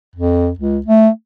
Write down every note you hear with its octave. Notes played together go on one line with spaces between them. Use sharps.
F2
C#2
A3